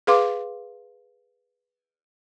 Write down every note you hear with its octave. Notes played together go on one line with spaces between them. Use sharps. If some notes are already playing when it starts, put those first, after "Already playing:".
G#4 B4 F5 C6 D6